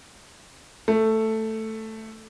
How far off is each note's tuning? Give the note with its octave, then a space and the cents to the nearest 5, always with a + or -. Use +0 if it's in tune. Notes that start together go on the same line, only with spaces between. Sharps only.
A3 +5